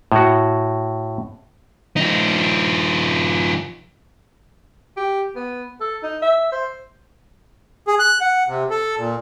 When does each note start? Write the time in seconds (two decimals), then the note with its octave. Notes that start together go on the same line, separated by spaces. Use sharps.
0.12 A2 F#4
1.96 F3 D#4
4.97 G4
5.36 B3
5.81 A4
6.03 D#4
6.22 E5
6.52 C5
7.87 G#4
7.99 F#6
8.21 F#5
8.48 C3
8.70 A4
8.98 A#2